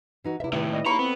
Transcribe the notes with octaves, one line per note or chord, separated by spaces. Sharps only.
E3 D#4 F#4
E2 C3 E4 E5
A2 D#3 E4 B4
G3 D#5
G2 C#3 A#3 D#4 A#5 B5 C#6
F2 B3 C4